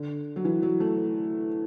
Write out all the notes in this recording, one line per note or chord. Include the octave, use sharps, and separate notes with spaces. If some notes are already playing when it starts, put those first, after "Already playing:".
Already playing: D3
F#3
E3
F#3
A3